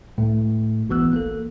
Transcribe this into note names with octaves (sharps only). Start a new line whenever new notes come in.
C#2 A2 A3
G#1 C#2 E3 B3 E6 F#6
A#3 A4